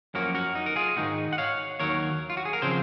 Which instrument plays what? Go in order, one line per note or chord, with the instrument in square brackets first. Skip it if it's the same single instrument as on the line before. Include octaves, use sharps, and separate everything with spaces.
[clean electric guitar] F#2 F3 A#3 C#4 F#4 A#4
F#4 A#4
D#4
A#4
F4 G#4
G#2 D#3 G#3 D#4 F#4
F#5
C#5 F5
D#2 D#3 F#3 A#4 C#5
F4
F#4
G#4
A#4
C#3 F3 C4 G#4 C5